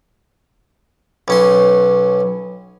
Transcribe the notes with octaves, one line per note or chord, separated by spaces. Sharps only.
B1 C#4 C6